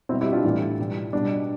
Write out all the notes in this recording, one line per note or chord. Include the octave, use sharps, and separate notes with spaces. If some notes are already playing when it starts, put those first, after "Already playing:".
B2 G3 C4 E4
E4 G4
D4 F4
A2 E3 G3
B2 G3
B2 G3 D4